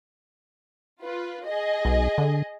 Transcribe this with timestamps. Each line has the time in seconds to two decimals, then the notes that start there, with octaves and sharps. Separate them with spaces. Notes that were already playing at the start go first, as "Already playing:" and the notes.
1.02 F4 B4
1.45 G#4 D#5
1.85 B1
2.18 D3